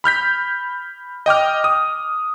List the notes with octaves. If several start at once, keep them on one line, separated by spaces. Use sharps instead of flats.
B5 F6 G6 B6
D#5 G5 D6 F6
D#6